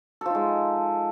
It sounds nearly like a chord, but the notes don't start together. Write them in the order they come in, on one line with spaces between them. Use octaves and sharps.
A4 F3 D#4 G#3